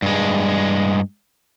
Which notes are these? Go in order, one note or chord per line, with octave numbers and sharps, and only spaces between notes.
G2 G#3